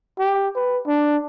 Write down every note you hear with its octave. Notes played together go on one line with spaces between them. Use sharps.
G4
B4
D4